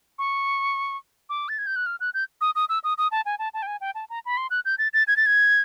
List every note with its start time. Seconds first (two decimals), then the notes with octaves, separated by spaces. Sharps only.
0.19 C#6
1.29 D6
1.49 A6
1.58 G#6
1.67 G6
1.76 F#6
1.86 F6
2.00 F#6
2.14 G6
2.41 D#6
2.55 D#6
2.69 E6
2.84 D#6
2.98 D#6
3.11 A5
3.26 G#5
3.39 A5
3.54 A5
3.62 G5
3.67 G#5
3.81 G5
3.95 A5
4.10 A#5
4.25 B5
4.37 C6
4.50 F#6
4.65 G6
4.78 A6
4.93 A6
5.07 G#6
5.17 A6
5.26 G#6